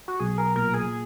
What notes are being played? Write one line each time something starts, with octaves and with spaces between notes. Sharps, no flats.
F#4
B1 G#4
A#4
A#2 A#4
G#4